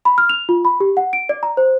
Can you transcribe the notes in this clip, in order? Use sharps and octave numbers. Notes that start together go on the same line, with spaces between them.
B5
F6
F7
F4
B5
G4
F#5
D7
D5
A#5
C5